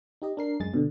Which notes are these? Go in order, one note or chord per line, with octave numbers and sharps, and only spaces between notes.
D#4 G4 D#5
D4 A#4 C7
F#2 G#3 G#4 A6
B2 D3